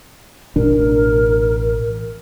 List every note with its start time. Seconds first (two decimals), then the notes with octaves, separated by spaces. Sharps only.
0.56 A1 B2 D4 A#4